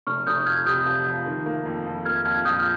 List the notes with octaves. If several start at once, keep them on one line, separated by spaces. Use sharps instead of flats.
F1 C#6 F6
F1 D#6 G6
F2 F6 G#6
C3 D#6 G6
F3
F3
D#3
A#3
F2
F2
A#3 F6 G#6
F2 F6 G#6
A#1 D#6 G6
F6